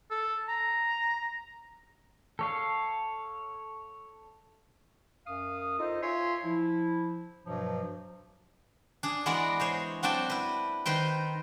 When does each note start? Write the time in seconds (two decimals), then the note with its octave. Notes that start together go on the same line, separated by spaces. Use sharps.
0.11 A4
0.49 A#5
2.39 A4 C#5 F5
5.27 F#2 F5 D#6
5.79 D#4 F4 A4 C5 D#5
6.02 F4 C#5 E5 G#5 C6
6.45 F3 E4
7.45 G2 B2 F3 F#3
9.03 D4 G#4
9.26 E3 G#3 B3 F#4 A#4 D5
9.60 G#4 C5 C#5
10.03 F#3 C4 D4 F#4 G5 A5
10.30 E4 B4
10.86 D#3 B4 C5 G5